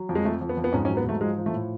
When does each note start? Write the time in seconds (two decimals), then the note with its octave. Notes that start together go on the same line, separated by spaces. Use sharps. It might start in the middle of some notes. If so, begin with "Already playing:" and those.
Already playing: F#3
0.09 F2
0.15 G#3
0.25 F2 A3
0.41 F2
0.49 B3
0.57 F2
0.64 B3
0.73 G#2 C#4
0.85 C#4
0.89 F#3
0.97 B3
1.05 G#2 A3
1.21 F3 G#3
1.38 F3
1.46 A3
1.53 A2